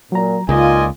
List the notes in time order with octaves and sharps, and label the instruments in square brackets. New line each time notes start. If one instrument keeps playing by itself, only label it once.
[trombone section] A#2 [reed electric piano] F#3 A#5
[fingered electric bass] C#2 [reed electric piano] C#3 [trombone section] A#3 D#4 F4 [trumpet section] D5 D#5 G#5